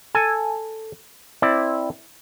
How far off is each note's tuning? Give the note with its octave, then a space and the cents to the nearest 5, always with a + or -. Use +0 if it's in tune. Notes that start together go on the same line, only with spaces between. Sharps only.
A4 +5 G#5 +0
C4 +10 E4 +0 D5 +15